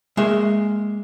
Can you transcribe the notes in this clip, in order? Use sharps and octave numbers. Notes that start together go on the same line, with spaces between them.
G#3 A#3 E5